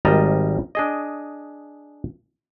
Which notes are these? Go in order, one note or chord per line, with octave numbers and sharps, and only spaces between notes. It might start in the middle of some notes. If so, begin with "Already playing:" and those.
G#1 G3 A#4 D#5 A5 A#5
D4 G#4 D#5